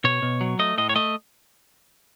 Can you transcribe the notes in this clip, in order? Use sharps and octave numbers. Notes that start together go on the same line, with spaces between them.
B2 C#5
B2
F#3
A3 D#5
A2 D#5
C#5
A3 D#5